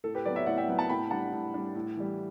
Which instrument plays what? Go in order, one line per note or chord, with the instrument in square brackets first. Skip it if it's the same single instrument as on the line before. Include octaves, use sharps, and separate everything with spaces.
[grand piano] A2 A4
G4 B4
F#3 B3 B4 D5
C#5 E5
A2 D5 F#5
E5 G5
F#3 B3
F#5 A5
A2 G5 B5
G3 D4 F#5 A5
A2
G3 D4
A2
E3 G3